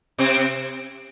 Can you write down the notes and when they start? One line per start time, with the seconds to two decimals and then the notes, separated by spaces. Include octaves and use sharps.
0.18 C3 C4